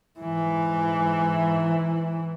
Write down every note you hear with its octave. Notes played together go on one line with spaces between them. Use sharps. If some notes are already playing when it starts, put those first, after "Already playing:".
G#2 E3